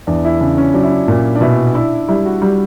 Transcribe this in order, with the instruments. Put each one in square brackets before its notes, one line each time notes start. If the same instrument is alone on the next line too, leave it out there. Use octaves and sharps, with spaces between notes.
[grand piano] E2 [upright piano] D4
[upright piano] E4
[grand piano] C#3 [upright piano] D4
[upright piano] C#4
[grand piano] F#3 [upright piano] D4
[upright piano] E4
D4
[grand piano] A#2
[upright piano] D4
[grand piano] B2 [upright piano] E4
[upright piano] D4 [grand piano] E4
[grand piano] G3 [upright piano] E4
[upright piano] F#4
[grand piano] G3